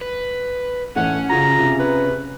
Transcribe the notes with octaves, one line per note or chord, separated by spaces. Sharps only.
B4
A1 A3 C#4 F#5
C#3 F4 F#4 A#5
C3 F4 G#4
B4